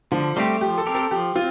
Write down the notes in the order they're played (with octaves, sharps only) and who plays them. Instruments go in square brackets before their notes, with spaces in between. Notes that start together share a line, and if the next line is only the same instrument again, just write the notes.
[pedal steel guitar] D3 [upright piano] F3
[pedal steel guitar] G3 C4 G4 [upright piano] A3
[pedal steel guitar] F3 [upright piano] G4
[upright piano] A4
[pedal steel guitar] C4 G4 A#4
[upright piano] A4
[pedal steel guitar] F3 [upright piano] G4
[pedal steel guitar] C4 [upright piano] F4